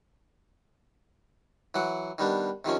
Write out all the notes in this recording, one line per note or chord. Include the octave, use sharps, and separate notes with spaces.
E3 F#3 F#5
D#3 G3 B3 D4
C3 D#3 F3 C#4